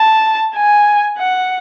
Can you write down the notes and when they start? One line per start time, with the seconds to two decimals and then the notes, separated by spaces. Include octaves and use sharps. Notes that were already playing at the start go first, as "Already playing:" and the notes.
Already playing: A5
0.55 G#5
1.19 F#5